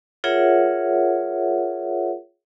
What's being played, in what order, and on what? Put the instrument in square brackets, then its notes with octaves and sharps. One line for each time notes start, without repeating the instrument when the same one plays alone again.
[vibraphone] F4 G#4 A#4 C#5 E5 F#5